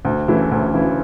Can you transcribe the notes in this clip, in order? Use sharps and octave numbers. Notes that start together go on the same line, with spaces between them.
D2
C#3 E3 A3 E4
D2
C#3 E3 A3 E4